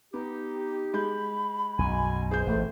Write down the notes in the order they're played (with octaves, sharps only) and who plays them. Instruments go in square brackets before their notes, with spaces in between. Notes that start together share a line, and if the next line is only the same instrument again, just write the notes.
[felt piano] B3 [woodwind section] D#4 G4
[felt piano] G#3 G6 [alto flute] B5
[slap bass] B1 F#2 [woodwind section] B2 G#5
[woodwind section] C#2 G#3 C5 [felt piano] G#4 G6
[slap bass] A1 [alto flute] A3